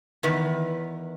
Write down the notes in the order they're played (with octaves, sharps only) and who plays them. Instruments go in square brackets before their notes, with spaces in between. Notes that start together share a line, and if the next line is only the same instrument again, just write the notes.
[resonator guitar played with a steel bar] E2 D#3 B4